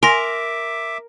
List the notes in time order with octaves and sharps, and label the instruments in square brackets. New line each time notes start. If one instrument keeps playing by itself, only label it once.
[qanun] A#4 [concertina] E5 D6 [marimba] G#5 [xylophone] C6 A#6